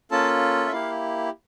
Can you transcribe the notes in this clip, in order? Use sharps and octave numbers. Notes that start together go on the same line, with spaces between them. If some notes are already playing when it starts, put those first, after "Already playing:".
A#3 C#4 F4 A4 A5
E5
A#3 E4 G4 F5